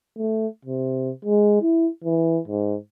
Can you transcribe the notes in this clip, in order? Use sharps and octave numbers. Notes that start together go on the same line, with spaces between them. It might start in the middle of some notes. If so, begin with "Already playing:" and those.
A3
C3
G#3
E4
E3
G#2